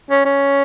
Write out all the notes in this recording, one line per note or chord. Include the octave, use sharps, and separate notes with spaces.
C#4
C#4